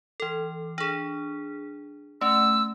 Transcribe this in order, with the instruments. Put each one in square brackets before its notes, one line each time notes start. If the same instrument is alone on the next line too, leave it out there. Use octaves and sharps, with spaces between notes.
[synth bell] E3 A4
D4 G#4
[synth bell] A3 C#4 [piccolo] E6